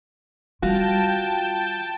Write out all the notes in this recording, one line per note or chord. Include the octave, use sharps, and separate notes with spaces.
D#3 G3 F4 F#4 G5 A5 E7